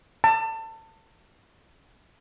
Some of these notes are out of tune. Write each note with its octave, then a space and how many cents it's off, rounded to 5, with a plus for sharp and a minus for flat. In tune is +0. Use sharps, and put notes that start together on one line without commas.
A5 +30